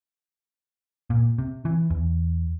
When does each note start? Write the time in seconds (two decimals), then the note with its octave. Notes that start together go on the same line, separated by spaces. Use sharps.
1.10 A#2
1.38 C3
1.65 E3
1.90 E2